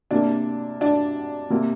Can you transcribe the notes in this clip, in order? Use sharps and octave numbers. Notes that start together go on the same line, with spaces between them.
C3 A#3 D4
D4
C3 A#3